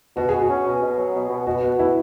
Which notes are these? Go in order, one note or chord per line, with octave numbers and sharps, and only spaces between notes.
B2 F#4
B2 G#4
F#4
C#4
B2
B2
F#3
B2
B2
B2 F#4
B2 F#4
B2 E4